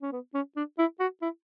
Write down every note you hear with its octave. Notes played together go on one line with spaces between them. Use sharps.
C#4
B3
C#4
D4
E4
F#4
E4